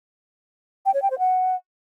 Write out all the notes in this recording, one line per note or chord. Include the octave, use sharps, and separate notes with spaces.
G5
C#5
G5
C5
F#5